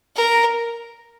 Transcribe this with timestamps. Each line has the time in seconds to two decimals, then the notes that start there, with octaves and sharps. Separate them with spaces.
0.16 A#4